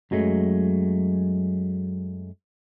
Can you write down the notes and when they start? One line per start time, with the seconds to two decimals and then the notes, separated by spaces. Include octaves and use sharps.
0.11 F#2 F#3 G#3 A3